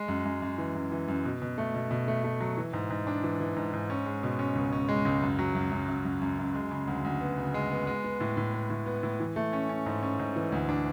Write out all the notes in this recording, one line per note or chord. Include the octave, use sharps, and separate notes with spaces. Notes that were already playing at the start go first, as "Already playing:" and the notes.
Already playing: G#3
F#2
F#2
F#2
E3
F#2
E3
F#2
B2
B2
A3
B2
B2
A3
A3
F#3
E3
G#2
G#2
D4
E3
E3
G#2
G#2
C#4
G#3
B2
C#4
C#2
C#4
G#3
C#2
F#2
F#3
F#2
F#2
F#2
F#2
F#2
F#2
G#3
C#3
D2
D2
B3
C#3
G#3
B3
G#3
B3
A2
A2
B3
A2
B3
A2
E3
A3
C#4
C#4
G#2
C#4
G#2
E3
D2
D4